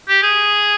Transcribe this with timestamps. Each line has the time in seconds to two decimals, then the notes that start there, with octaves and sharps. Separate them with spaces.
0.08 G4
0.22 G#4